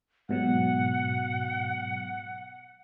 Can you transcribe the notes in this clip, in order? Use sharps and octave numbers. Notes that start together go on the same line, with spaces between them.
G#2 B2 F#3 F#5